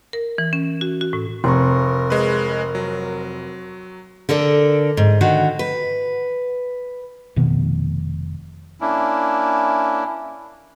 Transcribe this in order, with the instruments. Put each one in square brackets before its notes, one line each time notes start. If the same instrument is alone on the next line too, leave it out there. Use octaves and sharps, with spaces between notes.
[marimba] A#4
E3
C#4
F#4
F#4
A2
[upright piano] F1 [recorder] A#4 [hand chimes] C6 C#6
[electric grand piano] G#3 B4
F#3
[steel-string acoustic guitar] D3 A4 A#4 D5
G#2
D3 D#3 F#4
B4
[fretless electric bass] F1 B2 D#3 B3
[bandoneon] A#3 C#4 D4 E4